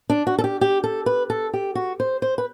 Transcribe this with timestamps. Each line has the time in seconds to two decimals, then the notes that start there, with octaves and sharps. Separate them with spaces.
0.10 D4
0.27 F#4
0.38 A4
0.44 G4
0.61 G4
0.84 A4
1.06 B4
1.30 A4
1.53 G4
1.75 F#4
2.00 C5
2.22 C5
2.38 B4